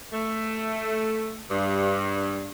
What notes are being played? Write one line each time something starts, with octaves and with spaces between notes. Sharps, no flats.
A3
G2